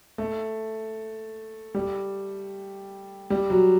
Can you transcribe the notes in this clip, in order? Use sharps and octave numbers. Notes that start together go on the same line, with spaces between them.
A3
G3
G3
F#3